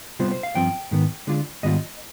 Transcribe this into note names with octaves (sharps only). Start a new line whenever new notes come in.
C3 G3 B3 F4 C5
C5
F5
G2 F3 C4 F4 G5
G#2 D#3 B3
D3 G#3 D4 F4
G#2 D#3 G3 B3 F4 D#5